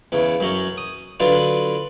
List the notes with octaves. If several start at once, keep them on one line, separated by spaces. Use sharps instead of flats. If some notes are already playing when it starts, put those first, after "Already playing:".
E2 C#3
F#2 F#3 C#4
D#6
D3 F#3 D4 F4 B4